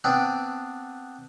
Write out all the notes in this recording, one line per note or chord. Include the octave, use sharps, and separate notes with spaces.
B3 C4 D4